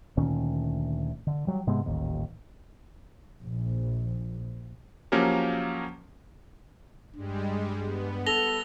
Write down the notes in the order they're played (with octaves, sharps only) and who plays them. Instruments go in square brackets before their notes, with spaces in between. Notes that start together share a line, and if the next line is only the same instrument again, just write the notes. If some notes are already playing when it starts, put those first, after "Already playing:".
[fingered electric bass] D2 A#2 D#3 C#4
D3
F#3 G3
G#2 C3 G#3 B3
D#1 A1 D#2
[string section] A#1
[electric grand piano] F3 F#3 A#3 C#4 G4 A#4
[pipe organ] G2 [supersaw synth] G3 G#3
[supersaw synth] B3
[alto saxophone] A4 [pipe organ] E6 [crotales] A#6 F7 G7